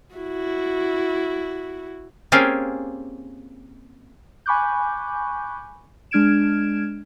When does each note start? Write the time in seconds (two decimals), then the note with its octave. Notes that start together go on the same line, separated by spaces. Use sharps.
0.16 E4 F#4
2.32 A#3 C4 C#4 F4 G4 G#4
4.46 G#5 B5 C#6 D6 F#6 G6
6.11 G#3 D4 F6 G#6 D7 E7